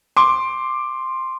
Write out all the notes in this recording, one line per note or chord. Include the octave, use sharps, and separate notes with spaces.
C6 D6